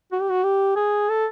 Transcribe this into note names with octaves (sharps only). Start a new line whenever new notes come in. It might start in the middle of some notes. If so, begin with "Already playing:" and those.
F#4
G4
F#4
G4
G#4
A4